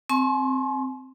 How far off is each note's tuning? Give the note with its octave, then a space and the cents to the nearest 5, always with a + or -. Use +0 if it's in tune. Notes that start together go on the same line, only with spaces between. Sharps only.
C4 +0 G#5 +45 C#6 -35